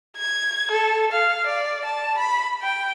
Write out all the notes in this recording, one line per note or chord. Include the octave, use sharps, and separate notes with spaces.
G#6
A4
F5
D5
A5
B5
G5